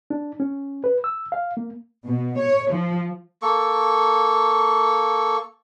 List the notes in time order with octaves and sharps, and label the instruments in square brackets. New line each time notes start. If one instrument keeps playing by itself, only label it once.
[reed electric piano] D4
C#4
B4
E6
F5
A#3
[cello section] B2
C#5
F3
[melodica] A#3 A4 C#6